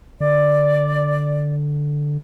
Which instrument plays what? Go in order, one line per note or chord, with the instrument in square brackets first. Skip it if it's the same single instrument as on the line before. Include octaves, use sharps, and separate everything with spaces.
[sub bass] D3 [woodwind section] D5